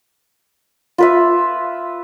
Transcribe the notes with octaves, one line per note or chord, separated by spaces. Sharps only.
F4 B4 E5